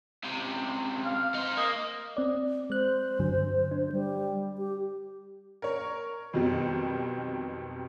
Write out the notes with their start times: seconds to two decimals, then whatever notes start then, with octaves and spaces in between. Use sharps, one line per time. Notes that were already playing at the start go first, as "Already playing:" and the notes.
0.24 C#2 C3
1.05 F5
1.35 D#4 C5
1.57 A#3 D#5
2.17 C4 D5
2.70 G#3 C5 F#6
3.19 G2 D3 F#3
3.71 D4
3.92 G3
4.58 G4
5.62 A#4 C#5
6.33 F2 B2 D#3 F#3 G3